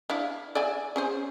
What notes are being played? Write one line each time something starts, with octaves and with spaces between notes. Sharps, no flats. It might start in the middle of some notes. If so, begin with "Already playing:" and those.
D4 E4 F5
D5 E5 G#5
C#4 G#4 C5